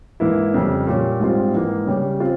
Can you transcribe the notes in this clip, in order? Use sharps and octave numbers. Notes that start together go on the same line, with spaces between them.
G#2 E3 A#3 E4
F2 C#3 G3
A#2 G3 C#4
G#2 G3 C4 F4
G#2 E3 A#3
C#3 G3 C#4 G4
C4 F4